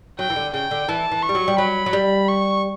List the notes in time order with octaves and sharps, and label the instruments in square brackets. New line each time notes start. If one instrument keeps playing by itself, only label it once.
[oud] F#3 [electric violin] G5
[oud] E3
D3
[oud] C#3 [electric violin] G5
[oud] D3
[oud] E3 [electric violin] A5
[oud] E3
[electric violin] C#6
[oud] G3
F#3
G3
[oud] F#3 [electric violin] B5
[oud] F#3
G3
[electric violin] C#6